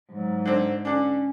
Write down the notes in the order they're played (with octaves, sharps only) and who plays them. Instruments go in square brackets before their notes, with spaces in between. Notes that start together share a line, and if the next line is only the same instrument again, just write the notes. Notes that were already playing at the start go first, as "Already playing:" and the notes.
[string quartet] G#2 [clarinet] F#3
[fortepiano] D3 C4
[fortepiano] D3 D4 [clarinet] C#4